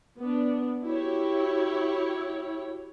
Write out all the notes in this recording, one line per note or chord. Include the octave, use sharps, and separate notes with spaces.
B3 D4
E4 F#4 G4 C#5